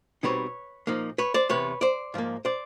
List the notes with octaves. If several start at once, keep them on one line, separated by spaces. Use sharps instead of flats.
B2 G3 C4 D#4 B4 C#5
A#2 F3 A#3 D#4
B4 C#5
C5 D5
E2 C3 B4 C#5
C5 D5
G#2 F3 A#3
C5 D5